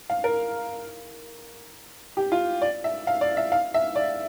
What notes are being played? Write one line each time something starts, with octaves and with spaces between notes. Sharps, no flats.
F5
A#4
G4
F4
D5
E5
F5
D5
E5
F5
E5
D5